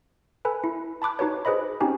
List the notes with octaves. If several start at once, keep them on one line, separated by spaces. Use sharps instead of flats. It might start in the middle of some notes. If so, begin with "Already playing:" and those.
A4 B4 G#5 B5
E4
A5 B5 D6 F#6
D#4 F#4 B4 C#5
G#4 B4 C5 D#5 B5
C4 C#4 D#4 F#4 G4 G#5